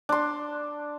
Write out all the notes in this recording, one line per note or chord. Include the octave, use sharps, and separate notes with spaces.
D4 C6